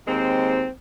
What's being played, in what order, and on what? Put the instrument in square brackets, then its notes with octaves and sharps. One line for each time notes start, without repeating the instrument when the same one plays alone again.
[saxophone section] D#2 G#3 C4